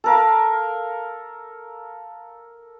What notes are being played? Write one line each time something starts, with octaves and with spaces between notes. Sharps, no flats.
A4 A#4 F5